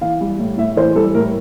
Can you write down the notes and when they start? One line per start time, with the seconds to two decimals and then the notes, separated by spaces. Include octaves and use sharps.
0.01 E3 F5
0.21 G3
0.39 A2
0.58 A2 E5
0.76 E3 C5
0.96 G3 A4
1.15 A2 A#4